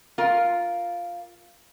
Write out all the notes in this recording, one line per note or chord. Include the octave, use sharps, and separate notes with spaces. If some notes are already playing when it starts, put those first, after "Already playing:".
F4 A#4